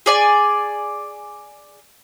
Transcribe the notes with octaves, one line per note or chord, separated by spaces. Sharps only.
G#4 D5 G#5